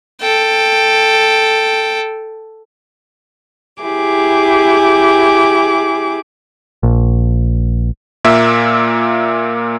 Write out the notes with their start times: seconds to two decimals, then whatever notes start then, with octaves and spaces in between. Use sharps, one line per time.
0.21 A4 G5
3.83 E4 G4 G#4 D6
6.83 A#1
8.24 A#2 A#3 E5